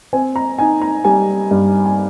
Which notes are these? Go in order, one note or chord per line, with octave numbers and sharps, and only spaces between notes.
C4 G#5
A#5
D#4 G#5
A#5
G3 G#5
G2
G#5